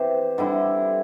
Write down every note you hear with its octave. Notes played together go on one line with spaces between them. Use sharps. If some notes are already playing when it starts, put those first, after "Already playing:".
Already playing: E3 C4 G4 C5
D3 G3 E4